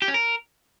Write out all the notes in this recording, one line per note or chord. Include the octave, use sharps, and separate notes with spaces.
G4
C#4
A#4